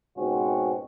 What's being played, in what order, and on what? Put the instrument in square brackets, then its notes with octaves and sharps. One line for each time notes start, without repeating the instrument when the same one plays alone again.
[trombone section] C#2 G#2 B2 C4 C#4 F#4